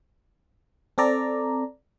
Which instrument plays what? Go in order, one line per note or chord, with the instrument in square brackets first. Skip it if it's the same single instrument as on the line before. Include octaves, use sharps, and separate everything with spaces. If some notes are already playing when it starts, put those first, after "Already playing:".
[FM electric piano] C4 A4 D5 A#5